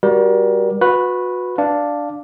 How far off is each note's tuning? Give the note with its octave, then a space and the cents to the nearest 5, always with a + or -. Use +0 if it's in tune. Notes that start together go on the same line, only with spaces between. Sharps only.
G3 +0 F#4 +0 A#4 +35
F#4 -30 B4 +0
D4 +0 F5 +0